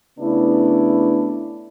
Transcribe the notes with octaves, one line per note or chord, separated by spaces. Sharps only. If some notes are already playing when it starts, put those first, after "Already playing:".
C#3 A3 B3 D4 E4